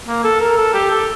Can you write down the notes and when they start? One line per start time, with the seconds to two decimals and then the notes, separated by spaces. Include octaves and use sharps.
0.08 A#3
0.24 A4
0.41 A#4
0.58 A4
0.74 G4
0.91 A4